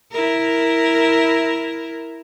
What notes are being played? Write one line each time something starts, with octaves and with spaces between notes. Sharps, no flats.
E4 A#4